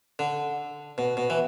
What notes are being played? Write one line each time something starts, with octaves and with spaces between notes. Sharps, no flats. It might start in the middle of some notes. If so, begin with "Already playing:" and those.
D3
B2
B2
E3